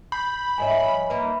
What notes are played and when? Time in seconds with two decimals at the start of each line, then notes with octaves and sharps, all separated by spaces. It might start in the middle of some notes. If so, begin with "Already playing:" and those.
0.12 B5 G6 C7
0.58 G#2 C5 C#5 D#5 E5 G#5
0.84 F3
1.10 A#3 D#4 B4 E5 B5